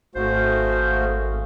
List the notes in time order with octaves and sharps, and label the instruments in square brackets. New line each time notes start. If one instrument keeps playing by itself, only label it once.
[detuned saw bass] G#1 [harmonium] A3 F#4 [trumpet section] G#4 F5 [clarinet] C5